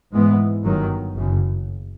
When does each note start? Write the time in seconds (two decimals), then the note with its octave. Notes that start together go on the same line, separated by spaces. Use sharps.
0.14 G#2 E3 G#3 B3
0.64 G1 F#2 D#3 F#3
1.16 F#1 F#2 C#3